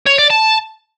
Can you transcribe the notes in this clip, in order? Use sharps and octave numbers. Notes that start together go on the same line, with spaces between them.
C#5
D5
A5